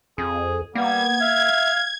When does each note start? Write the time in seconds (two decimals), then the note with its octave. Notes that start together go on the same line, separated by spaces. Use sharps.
0.18 F2 G#4
0.75 G3 A#3 B3 G#6
1.21 E5 F5